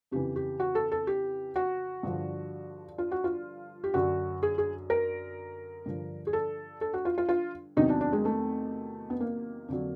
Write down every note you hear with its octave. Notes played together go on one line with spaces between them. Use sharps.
F2 C#3 E3 G4
G4
F#4
A4
A4
G4
F#4
G2 D3 F3
F4
F#4
F4
G4
F#2 D3 F#3 F#4
G#4
G#4
A#4
G2 D3 F3
G#4
A4
A4
F#4
F4
F4
F4
E2 C3 D#3 F#3 D#4
D4
D4
G#3
A3
B3
A#3
F2 D3 F#3